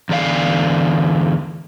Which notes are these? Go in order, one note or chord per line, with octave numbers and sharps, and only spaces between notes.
E2 D3 D5 F5